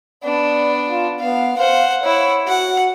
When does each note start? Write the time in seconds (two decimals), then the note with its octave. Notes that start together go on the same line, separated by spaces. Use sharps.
0.24 B3 D4 D5
0.89 F4
1.20 B3 F5
1.58 C5 F5 F#5
2.03 E4 C#5 F#5
2.48 F#4 F#5